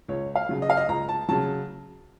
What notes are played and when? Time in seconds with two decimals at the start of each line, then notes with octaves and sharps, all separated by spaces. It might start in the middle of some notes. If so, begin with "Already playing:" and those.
0.08 C#2 C#5
0.35 F5
0.49 C#3 F#3
0.62 D#5
0.70 F5
0.77 D#5
0.88 C#2 A#5
1.09 A5
1.29 C#3 F#3 A5